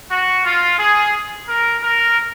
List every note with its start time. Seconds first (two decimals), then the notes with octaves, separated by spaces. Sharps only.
0.11 F#4
0.45 F4
0.79 G#4
1.49 A#4
1.83 A#4